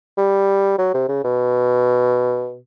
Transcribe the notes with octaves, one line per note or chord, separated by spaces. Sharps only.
G3
F#3
C3
C#3
B2